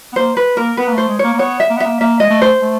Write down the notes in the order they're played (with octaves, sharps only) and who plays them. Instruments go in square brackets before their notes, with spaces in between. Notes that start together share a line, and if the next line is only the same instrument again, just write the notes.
[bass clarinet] B3
[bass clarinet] A#3 [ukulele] C5
[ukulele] B4
[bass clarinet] A#3 [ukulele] A#4
[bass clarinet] B3 [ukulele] B4
[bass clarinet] A#3
[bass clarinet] A3 [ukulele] C5
[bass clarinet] G#3
[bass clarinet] A#3 [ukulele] C#5
[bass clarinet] A#3
[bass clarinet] B3 [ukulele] C#5
[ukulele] E5
[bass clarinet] A#3
B3
[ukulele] E5
[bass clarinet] A#3
[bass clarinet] A#3 [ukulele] E5
[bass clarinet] G#3 [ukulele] D#5
[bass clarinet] A3
[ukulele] C5
[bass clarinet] A3